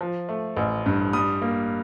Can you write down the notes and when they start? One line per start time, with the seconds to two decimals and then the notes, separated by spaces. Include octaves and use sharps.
0.01 F3
0.29 A3
0.56 A1
0.86 G2
1.13 G3 D#6
1.42 A#3